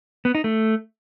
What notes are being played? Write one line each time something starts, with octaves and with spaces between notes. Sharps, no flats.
B3
D#4
A3